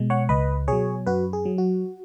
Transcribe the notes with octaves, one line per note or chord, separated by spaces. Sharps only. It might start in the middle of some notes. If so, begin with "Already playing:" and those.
Already playing: B2 G#3
C#5 F#5
C#2 B4 D#5
B2 F#3 G#4 C#5
F#2 F#4 B4
G#4
F#3
F#4